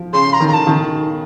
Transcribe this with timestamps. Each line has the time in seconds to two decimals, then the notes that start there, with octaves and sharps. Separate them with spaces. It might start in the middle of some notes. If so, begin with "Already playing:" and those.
Already playing: F3
0.13 C#3 C6
0.33 A#5
0.40 D#3
0.48 A#5
0.53 A5
0.67 D#3